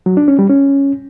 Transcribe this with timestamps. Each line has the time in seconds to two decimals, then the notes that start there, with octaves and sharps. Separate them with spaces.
0.06 F#3
0.17 D4
0.28 C#4
0.39 G3
0.50 C#4